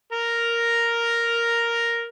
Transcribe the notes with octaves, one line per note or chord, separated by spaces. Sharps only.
A#4 A#5